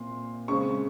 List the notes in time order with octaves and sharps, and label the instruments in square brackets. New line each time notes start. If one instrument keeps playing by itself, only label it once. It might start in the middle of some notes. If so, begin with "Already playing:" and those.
Already playing: [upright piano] A#2 C4 C6
C#3 G#3 C4 C#6